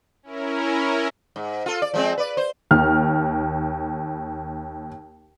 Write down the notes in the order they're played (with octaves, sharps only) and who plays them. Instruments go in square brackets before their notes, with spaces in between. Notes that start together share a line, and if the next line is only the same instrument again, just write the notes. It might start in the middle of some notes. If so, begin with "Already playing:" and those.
[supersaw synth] C#4 E4 A#4
[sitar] G#2
F4 A4
D5
F3 G#3 C4
B4 D5
C5
[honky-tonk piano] D#2 F6